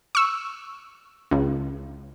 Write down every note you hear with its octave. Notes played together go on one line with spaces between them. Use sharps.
C#6 E6
C#2